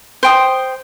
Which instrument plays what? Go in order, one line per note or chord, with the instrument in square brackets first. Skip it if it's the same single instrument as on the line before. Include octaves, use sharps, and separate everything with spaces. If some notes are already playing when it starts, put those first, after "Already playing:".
[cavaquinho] C5 G5 D#6